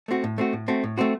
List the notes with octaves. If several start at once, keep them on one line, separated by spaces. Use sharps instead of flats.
A3 C4 F#4
A2
A3 C4 F#4
A2
A3 C4 F#4
A2
A3 C4 F#4